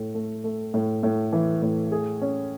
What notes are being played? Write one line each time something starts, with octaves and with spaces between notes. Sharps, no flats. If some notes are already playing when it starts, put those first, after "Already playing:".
Already playing: A2 A3
A3
A3
A2
A2
E3
A2
G#4
C#4